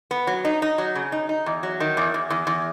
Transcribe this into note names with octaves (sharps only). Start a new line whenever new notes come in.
B3
F#3
D#4
D#4
F#3
C#3
D#4
D#4
E2
F#3
D#3
E2
E2
E2
E2